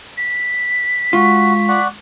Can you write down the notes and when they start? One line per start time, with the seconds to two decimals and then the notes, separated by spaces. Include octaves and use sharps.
0.17 B6
1.13 G#3 F4 F#4 C#6
1.68 D5 F#5 C#6